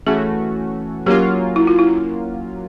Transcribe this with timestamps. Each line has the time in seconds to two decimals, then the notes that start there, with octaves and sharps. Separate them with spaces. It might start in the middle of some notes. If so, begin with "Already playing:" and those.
0.06 E3 A3 C#4 F#4 G#4
1.06 F#3 A#3 C#4 F4 G4
1.56 E4
1.67 F4
1.79 E4